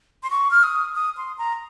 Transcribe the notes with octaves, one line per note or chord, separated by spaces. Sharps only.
C6
C#6
F6
D#6
D#6
C6
A#5